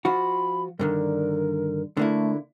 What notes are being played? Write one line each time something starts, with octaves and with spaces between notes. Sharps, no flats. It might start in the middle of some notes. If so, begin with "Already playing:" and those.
F3 F4 F#4 B5
G2 D3 D#3 A#4
D3 A3 A#3 E4